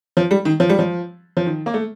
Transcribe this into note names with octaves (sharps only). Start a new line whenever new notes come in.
F3
G3
D#3
F3
G3
F3
F3
D#3
A#3
A3